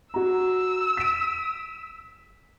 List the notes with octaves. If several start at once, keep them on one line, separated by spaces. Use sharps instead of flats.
F#4 A#5 E6
B6 D7